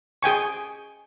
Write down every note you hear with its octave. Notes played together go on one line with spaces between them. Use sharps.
G#4 G5 G#5 C#6